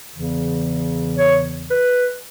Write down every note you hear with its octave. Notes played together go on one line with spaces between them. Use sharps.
E2 C#3 E3
C#5
B4